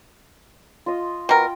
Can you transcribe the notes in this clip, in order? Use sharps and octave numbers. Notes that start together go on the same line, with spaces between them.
F4 D#5
B2 A#4 G5